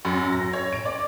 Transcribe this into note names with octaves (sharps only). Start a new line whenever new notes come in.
F#2
A#6
C#5
D7
D5